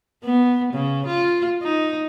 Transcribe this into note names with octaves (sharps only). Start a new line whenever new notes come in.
B3
C#3
F4
D#4